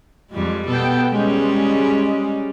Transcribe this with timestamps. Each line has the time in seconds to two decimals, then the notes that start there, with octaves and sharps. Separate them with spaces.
0.31 F2 G3 G#3
0.68 B2 B3 A4 G5
1.12 G3 G#3 C#4